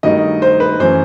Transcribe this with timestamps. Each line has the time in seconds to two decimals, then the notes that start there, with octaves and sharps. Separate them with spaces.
0.03 G2 D#3 F#3 A3 D#5
0.42 C5
0.60 B4
0.80 F#2 E3 A3 C5